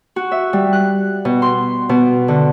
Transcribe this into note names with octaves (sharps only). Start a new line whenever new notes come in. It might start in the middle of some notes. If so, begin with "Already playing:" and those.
F#4
E5
G3
F#6
B2
C6
B2
D3